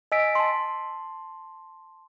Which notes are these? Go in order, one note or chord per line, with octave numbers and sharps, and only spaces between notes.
D#5 G#5 E6 B6 D7
A5 C6